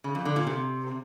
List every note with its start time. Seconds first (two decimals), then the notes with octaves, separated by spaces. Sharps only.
0.04 C#3
0.15 F2
0.25 D3
0.36 A#2
0.47 C3